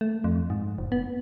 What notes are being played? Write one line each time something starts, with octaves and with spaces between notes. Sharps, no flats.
A3
F2
G#2
F1
B3